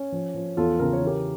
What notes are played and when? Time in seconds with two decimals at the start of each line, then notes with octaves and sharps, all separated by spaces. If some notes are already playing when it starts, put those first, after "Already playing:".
Already playing: C#4
0.12 F3
0.35 F3
0.57 E2 F4 A4
0.79 C#3 A#4
0.93 C#5
1.02 E3 G4 A#4